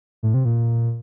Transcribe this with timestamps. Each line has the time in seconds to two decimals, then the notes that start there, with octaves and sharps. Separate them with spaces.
0.23 A2
0.34 C3
0.45 A#2